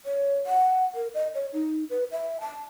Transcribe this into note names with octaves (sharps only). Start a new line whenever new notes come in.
C#5
F#5
A#4
D#5
C#5
D#4
B4
E5
A5